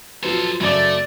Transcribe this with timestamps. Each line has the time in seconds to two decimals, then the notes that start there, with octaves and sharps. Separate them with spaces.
0.23 F3 F#3 A4 B4 C5
0.61 F#2 C#3 A3 D5